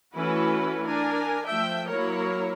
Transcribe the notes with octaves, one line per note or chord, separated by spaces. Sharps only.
E3 A3 C#4 E4 F#4 B4
D4 A#4 G#5
F3 A3 E5 G5
F#3 A#3 E4 A#4 C#5